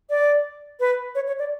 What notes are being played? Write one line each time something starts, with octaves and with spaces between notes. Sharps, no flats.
D5
B4
C#5
C#5
D5